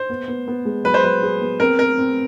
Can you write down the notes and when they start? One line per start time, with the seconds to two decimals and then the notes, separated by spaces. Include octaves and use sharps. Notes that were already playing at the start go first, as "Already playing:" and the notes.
Already playing: C5
0.10 B3
0.28 B3
0.48 B3
0.65 G#3
0.84 F#3 B4
0.94 C5
1.04 F#3 B4
1.23 G#4
1.41 B3
1.60 C4 A#4
1.78 C4 A#4
1.98 C4